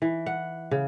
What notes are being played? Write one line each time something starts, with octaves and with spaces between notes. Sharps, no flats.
E3
F#5
C#3